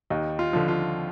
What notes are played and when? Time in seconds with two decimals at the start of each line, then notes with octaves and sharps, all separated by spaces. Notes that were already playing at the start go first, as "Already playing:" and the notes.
0.10 D#2 D#4
0.39 F4
0.53 D3 F3
0.68 F4